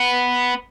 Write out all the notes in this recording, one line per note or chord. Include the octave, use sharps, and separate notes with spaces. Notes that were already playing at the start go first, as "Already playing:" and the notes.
Already playing: B3